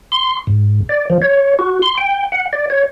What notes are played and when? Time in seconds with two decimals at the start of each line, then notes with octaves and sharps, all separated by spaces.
0.12 C6
0.47 G#2
0.89 D5
1.10 F3
1.22 C#5
1.59 F#4
1.82 C6
1.98 G5
2.32 F#5
2.53 D5
2.70 C#5